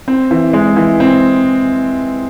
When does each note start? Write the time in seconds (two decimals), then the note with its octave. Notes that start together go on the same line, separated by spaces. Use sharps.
0.08 C4
0.31 E3
0.53 G#3
0.77 E3
1.00 C4